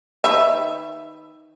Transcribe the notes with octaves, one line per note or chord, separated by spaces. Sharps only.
D#3 B4 E5